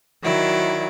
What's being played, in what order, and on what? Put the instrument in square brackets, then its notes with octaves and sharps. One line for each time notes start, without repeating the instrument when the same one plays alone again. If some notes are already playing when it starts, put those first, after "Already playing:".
[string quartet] D#3 F#3 E4 D5